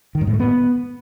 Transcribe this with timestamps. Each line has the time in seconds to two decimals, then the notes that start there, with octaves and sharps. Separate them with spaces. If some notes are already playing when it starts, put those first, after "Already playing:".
0.15 D#3
0.21 G2
0.27 A2
0.33 A3
0.40 B3